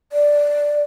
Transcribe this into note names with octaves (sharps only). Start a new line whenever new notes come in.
D5